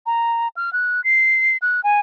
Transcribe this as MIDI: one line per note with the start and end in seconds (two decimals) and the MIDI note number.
0.06 0.48 82
0.57 0.73 89
0.73 1.03 90
1.04 1.57 96
1.62 1.81 90
1.84 2.00 80